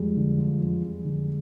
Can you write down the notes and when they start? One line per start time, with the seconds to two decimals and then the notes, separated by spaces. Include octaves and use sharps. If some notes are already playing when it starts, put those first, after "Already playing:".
Already playing: F2 G3 G#3
0.17 D3
0.38 F3
0.60 F2
0.83 F2
1.04 D3